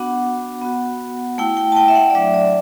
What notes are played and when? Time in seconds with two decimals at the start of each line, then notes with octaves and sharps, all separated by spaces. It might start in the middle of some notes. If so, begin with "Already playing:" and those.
Already playing: B3 D4 F#4 F#5
0.62 B3 F#4
1.38 A3 E4 G5
1.57 G5
1.72 A5
1.77 G5
1.88 E5
1.95 F#5
2.10 D5
2.15 F#3 A3 D4 E5
2.34 D5